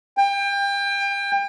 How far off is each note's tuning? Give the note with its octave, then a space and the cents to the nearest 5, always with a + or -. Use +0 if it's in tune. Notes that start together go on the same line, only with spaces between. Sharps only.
G5 +30